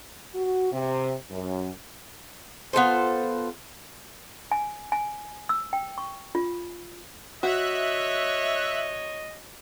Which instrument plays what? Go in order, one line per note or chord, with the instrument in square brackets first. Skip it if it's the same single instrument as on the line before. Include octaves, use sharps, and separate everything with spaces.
[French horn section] F#4
C3
F#2
[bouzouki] B3 F4 A4 C5
[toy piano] G#5
G#5
E6
G5
C#6
F4
[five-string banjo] F#4 [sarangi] C#5 [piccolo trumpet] D#5 [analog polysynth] E5 F#6